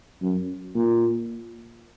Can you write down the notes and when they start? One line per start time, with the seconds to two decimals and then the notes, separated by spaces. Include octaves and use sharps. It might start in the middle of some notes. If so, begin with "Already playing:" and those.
0.22 F#2
0.75 A#2